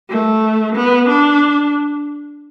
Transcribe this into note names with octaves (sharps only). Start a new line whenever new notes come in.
A3
B3
D4